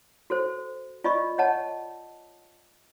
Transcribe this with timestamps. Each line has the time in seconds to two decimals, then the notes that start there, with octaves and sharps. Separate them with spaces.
0.30 F#4 A4 C5
1.04 F4 D5 D#5 B5 C#6
1.38 C#5 D#5 F#5 A5